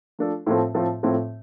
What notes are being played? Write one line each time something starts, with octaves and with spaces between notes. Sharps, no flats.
F3 A3 D4 A4
A2 F3 A3 C4
A2 F3 A3 C4
A2 F3 A3 C4